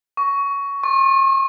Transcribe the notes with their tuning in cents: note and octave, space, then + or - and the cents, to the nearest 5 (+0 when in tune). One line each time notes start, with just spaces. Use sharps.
C#6 +15
C#6 -45